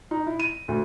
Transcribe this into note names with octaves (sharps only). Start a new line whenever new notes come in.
D#4
E4
D#7
D2